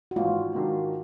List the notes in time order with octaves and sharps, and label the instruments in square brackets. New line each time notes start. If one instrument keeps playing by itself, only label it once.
[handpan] F#4
[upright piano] G#1 G#2 E3 [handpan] F4
[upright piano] G#2 D#3 F#3 A#3 D4